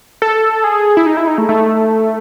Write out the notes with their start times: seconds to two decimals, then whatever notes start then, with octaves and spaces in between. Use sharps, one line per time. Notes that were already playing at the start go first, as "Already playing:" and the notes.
0.22 A4
0.64 G#4
0.97 E4
1.06 D#4
1.17 E4
1.27 D#4
1.38 A3
1.49 A3